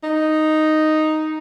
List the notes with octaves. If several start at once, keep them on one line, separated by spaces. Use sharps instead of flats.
D#4